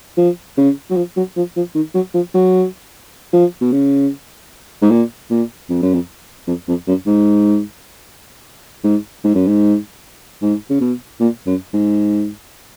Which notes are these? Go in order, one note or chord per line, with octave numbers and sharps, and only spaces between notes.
F3
C#3
F#3
F3
F#3
F3
F3
D#3
F#3
F3
F#3
F3
B2
C#3
G#2
A#2
A#2
F2
F#2
F2
F2
F2
F#2
G#2
G#2
G#2
F#2
G#2
G#2
C#3
B2
A#2
F#2
G#2